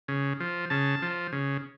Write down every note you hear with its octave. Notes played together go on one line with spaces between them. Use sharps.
C#3
F3
C#3 A5
F3
C#3